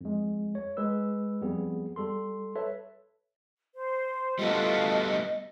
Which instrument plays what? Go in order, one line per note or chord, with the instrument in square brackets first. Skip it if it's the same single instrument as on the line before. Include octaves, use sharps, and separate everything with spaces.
[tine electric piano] F2 G#3
C#5
G#3 B4 E6
F2 G3 B3 G#4
G3 A4 C6
A4 B4 C#5 E5
[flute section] C5
[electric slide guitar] G3 A3 B3 [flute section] F4 F#4 A4 [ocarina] D#5